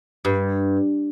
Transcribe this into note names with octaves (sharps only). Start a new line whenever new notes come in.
G2